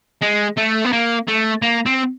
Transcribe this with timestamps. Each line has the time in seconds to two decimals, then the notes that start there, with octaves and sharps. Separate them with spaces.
0.22 G#3
0.58 A3
0.85 B3
0.93 A#3
1.28 A3
1.62 A#3
1.86 C4